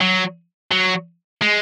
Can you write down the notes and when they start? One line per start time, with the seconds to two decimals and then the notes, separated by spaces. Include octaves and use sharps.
0.01 F#3
0.72 F#3
1.42 G#3